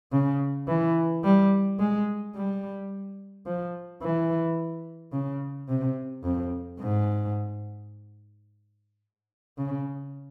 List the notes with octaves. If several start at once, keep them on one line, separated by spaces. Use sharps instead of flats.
C#3
E3
G3
G#3
G3
F3
E3
C#3
C3
F2
G#2
C#3